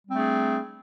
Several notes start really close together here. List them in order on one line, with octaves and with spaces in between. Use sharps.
G3 C4 D4 A3 G#4